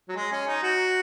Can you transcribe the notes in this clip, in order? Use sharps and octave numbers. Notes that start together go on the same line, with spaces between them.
F#3
G#3
C#4
D#4
F#4